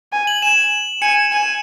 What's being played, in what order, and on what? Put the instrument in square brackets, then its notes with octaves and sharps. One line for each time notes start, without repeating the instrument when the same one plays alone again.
[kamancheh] G#5
[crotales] F#7
[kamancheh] G#5 [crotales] E7
[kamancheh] G#5 [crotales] C#7
[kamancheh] G#5 [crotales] E7